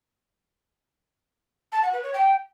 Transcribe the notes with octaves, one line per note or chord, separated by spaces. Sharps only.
A5
F#5
B4
C#5
G5